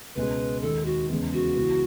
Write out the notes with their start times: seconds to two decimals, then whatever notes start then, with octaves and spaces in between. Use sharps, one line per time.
0.15 C#2 B2 G#3 C#4 B4
0.62 D#2 D#3 G#3 A4
0.85 F#4
1.09 E2 C#3 G#3 B3
1.33 F#4
1.56 C#2 C#3 E3 B3 E4